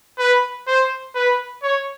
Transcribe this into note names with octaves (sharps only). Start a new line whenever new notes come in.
B4
C5
B4
C#5